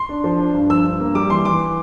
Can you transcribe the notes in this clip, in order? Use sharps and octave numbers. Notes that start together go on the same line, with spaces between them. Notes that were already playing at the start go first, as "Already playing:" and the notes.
Already playing: C6
D4
F3
D4
G2
F3 E6
G2
A#3
G3 D6
E3 C6
E3 D6